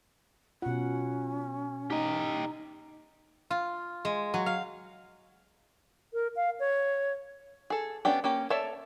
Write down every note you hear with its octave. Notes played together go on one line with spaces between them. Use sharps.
B2 C#4 F4 F#5
D#4 G4 D#5 A#5
F4
G#3
F#3
F5
A#4
F5
C#5
G#4 A4
B3 C#4 D4 G4
A#3 C#4 G4
A4 C#5 D5 E5 A5